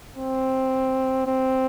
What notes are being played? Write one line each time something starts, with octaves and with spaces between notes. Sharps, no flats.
C4
C4